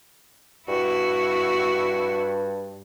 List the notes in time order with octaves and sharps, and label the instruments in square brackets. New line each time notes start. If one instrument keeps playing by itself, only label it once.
[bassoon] G2 [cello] E4 F#4